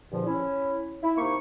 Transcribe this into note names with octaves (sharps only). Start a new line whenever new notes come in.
E2 G2 A#2 D3 F3
C#4 E4
E4
C3 A#3 D#4 C#6